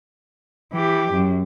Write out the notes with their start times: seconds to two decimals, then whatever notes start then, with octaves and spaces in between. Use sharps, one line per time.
0.73 E3 G4
1.12 F#2